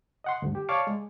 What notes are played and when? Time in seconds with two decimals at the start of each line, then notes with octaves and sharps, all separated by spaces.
0.24 D#5 F#5 C6
0.42 D2 G2
0.55 G4
0.69 C#5 D5 F5 A5 C#6 D6
0.87 G#3